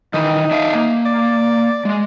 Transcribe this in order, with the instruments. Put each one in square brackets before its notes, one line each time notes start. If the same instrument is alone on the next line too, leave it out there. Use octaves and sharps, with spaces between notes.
[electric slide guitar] D#3 E3 [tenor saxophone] D#4
[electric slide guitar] D4 E5 F5
A#3
[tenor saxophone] D5
[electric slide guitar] G#3